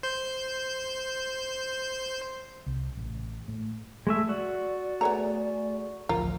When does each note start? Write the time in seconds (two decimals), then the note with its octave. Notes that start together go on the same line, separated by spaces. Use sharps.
0.03 C5 G6
2.66 C2
2.97 A1
3.48 A2
4.07 G#3 A3 E5
4.29 F#4 D5
5.01 A3 B3 G#4 C#5 A#5
6.09 A1 D2 F3 F4 A#4